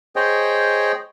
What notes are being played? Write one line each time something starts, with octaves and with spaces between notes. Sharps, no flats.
G#4 C5 C#5 D#5 G5